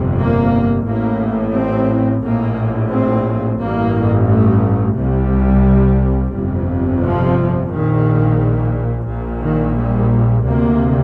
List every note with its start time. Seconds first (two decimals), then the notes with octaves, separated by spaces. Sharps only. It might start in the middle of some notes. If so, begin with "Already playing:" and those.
Already playing: G1 F2 C3
0.17 A#3
0.85 A1 A2 A#3
1.54 C4
2.22 A#1 A2 A#3
2.92 C4
3.60 A1 G2 A#3
4.28 A3
4.97 C2 C3 G3
6.34 G1 F2 C3
7.03 F3
7.71 A#1 A#2 D#3
9.08 A#1 A#2
9.42 D#3
9.77 G3
10.45 D2 C3 A#3